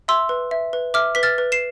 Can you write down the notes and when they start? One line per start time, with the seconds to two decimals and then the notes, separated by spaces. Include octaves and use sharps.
0.08 E5 C6 E6
0.29 B4
0.51 E5
0.73 B4
0.94 E5 D6 F6
1.15 B4 B6
1.23 F6 A6
1.38 B4
1.52 C7 E7